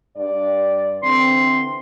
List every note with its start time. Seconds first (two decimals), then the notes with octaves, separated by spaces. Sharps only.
0.17 G2 D5
1.03 D3 E3 C4 C6